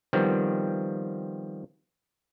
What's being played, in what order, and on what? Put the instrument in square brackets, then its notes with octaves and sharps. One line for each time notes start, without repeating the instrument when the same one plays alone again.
[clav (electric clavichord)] D#3 F3 G3 B3 C4